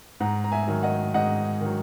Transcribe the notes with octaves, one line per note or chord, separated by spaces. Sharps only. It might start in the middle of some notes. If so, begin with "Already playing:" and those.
G#2 F#5 A#5
A#5
E5 G#5
D#3 F#3
D#5 F#5
G#2 D#5 F#5
D#3
F#3